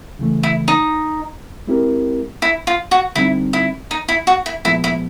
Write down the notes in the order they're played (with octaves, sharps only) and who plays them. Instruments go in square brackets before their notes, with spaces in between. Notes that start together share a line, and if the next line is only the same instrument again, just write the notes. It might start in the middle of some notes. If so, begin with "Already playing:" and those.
[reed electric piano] C#3 E3 A3
[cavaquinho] E4
D#4
[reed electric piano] G#3 C4 E4 G4 A#4
[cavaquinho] E4
F4
F#4
[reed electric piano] D3 G3 C4 D#4 [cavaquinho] E4
[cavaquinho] E4
D#4
E4
F#4
E4
[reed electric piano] A#2 F3 G#3 B3 [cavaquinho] E4
[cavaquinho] E4